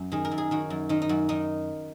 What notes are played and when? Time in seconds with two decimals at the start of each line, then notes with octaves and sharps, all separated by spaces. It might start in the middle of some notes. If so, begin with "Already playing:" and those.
Already playing: F#2
0.12 D#3 G#4
0.25 A#4
0.31 F#2
0.38 G#4
0.51 D#3 F#4
0.70 F#2
0.89 D#3 D#4
1.02 D#4
1.09 F#2 F#4
1.29 D#3 D#4